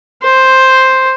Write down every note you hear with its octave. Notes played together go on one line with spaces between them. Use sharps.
C5